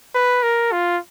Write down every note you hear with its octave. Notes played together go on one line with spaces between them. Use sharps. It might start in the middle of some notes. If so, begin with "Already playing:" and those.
B4
A#4
F4